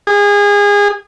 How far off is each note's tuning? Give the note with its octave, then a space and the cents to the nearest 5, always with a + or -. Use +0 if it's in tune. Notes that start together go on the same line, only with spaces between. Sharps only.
G#4 -25